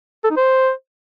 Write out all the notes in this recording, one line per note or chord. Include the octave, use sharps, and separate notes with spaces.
A4
D#4
C5